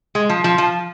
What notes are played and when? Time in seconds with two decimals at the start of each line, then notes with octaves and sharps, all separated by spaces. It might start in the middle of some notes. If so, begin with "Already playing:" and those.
0.15 G#3
0.29 F3
0.44 F3
0.58 F3